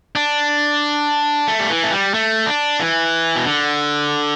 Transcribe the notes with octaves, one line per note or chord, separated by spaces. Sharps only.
D4
A3
G3
E3
A3
G3
A3
D4
E3
B2
D3